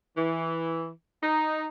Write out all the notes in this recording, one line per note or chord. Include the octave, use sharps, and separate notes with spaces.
E3
D#4